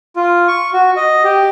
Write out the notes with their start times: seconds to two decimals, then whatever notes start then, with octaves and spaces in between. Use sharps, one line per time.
0.16 F4
0.48 C#6
0.73 F#4
0.96 D#5
1.24 G4